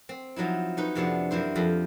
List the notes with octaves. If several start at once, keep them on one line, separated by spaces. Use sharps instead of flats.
C4
F3 F#3 D#4 E4
C#4 D#4 B4
F2 C3 B3 C#4 D4 E4
F#2 E3 E4 C5
F2 G4 B5